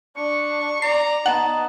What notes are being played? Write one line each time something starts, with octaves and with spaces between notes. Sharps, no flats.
D4 C#6
D5 A#5 C7
B3 D#4 F#5 A5